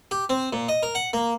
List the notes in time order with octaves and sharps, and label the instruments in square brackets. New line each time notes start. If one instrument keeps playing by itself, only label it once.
[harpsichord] G4
C4
A#2
D#5
A#4
F#5
A#3